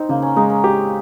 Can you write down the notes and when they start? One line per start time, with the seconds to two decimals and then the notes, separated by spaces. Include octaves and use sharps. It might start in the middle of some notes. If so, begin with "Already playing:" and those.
Already playing: C4 D#4
0.09 C#3 A#3
0.22 C#4
0.36 G#3 D#4
0.50 C#4
0.64 G4